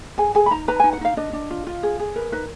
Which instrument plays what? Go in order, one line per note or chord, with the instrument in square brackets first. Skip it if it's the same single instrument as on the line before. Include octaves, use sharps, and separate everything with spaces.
[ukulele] G#4 G#5
G#4 G#5
B5
D#4 A#5
B4 A#5
G#5
D#4
F#5
D#4 F5
D4 D#5
D4
F4
F4
G#4
G#4
A#4 B4
D#4 B4